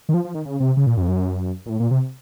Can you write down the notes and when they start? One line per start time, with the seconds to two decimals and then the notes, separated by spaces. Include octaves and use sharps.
0.09 D#3
0.14 F3
0.25 F3
0.35 D#3
0.45 C#3
0.60 C3
0.77 C#3
0.87 A#2
0.97 F#2
1.02 F2
1.08 F#2
1.66 A#2
1.69 A2
1.80 A#2
1.91 C3